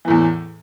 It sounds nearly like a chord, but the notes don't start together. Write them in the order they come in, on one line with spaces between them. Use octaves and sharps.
E3 A2 E2